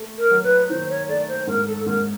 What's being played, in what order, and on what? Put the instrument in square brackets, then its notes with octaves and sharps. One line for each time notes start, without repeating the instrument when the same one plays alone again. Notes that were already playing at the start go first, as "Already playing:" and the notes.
Already playing: [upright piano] A3
[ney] A#4
[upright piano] F#3
[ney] B4
[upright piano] D#3 [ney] C5
[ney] C#5
[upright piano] A3 [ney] D5
[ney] C5
[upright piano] G#2 [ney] A#4
[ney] A4
[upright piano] G#2 [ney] A#4